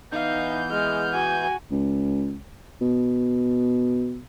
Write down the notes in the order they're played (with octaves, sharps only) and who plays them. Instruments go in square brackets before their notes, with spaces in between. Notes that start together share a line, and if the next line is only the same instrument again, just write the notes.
[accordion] E3 B3 G6 [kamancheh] D#4 F5
[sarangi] G#3 [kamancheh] F6
[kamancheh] F#4 [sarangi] G#5
[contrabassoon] C#2
B2